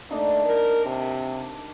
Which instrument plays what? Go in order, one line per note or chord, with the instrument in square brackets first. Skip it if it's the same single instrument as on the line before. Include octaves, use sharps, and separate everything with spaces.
[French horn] A3 [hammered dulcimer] A#3 D4 D#4
[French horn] A#4
C3